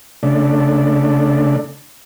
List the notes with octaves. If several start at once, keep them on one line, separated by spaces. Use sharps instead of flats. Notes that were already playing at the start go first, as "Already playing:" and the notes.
C#3 A3 D4